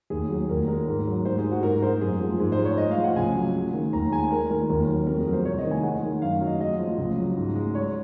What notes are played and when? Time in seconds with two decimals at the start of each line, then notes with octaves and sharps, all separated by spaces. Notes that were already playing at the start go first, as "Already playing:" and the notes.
0.10 D#2 G#4
0.29 F#3
0.49 D#2 A#4
0.68 G#3 A#4
0.87 G#2
1.07 F#3
1.25 G#2 C5
1.38 G#4
1.45 G#3
1.51 F#4
1.63 G#2 A#4
1.82 G#3 C5
2.01 F#2 G#4
2.20 F3
2.40 G#2 G#4
2.52 C5
2.59 G#3
2.65 C#5
2.78 G#3 D#5
2.91 F5
2.98 F3
3.04 F#5
3.16 C#2 G#5
3.35 F#3
3.55 G#3
3.74 D#3
3.93 D#2 A#5
4.12 G#3 G#5
4.31 G#3 A#4
4.50 D#3 A#4
4.70 D#2 A#4
4.88 F#3
5.07 F2 A#4
5.20 G#4
5.26 F#3
5.33 C5
5.45 C2 C#5
5.58 D#5
5.64 D#3
5.71 G#5
5.83 G#3 F#5
6.03 D#3
6.22 F#2 F5
6.41 F#3
6.47 D#5
6.60 G#3 D#5
6.79 F3
6.98 C#2
7.18 F#3
7.36 G#2
7.55 G#3
7.75 G#3 C#5